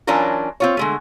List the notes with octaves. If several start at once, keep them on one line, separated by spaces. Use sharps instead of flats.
E3 F#3 C#4 D4 F4 A#4
C4 F4 C#5
D3 G#3 A3